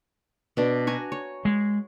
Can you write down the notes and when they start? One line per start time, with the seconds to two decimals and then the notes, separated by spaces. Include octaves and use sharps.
0.57 B2 D4
0.87 F#4 G#5 A#5
1.12 C#5
1.45 G#3